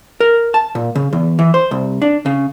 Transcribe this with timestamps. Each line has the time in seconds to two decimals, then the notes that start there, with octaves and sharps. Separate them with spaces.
0.20 A#4
0.54 A5
0.75 A#2
0.95 C#3
1.13 E2
1.39 E3
1.54 C5
1.71 C2
2.02 D4
2.26 C#3